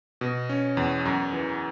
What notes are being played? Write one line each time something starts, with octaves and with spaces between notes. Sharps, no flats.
B2
C#4
E2
F#2
E3